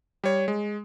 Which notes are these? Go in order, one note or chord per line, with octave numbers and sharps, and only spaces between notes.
G3 C#5
G#3